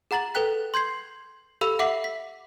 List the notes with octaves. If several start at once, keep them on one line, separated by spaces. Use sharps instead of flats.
G#4 F#5 A#5 A6 F#7
A4 B4 G5 F#6 B6
C6 G6 G#6 C7
G4 A4 F5 B5 E6 F7
E5 F#5 D6 B6 C7 F#7
B6